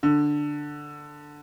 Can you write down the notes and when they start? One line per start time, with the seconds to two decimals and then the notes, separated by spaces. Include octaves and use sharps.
0.03 D3